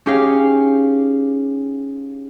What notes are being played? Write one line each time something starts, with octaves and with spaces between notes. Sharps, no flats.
C#4 D#4 G4 G#4 C#5 F5